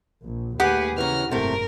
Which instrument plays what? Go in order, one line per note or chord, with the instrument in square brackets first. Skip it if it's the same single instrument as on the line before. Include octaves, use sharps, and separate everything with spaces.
[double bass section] A#1
[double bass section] D#2 A3 [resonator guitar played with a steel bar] G4 F#5 [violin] G#4 B4
[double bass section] C#3 [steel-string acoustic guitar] E3 C#4 [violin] A#5 F6
[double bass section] F#1 G#2 [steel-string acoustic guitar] C3 A3 [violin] A#4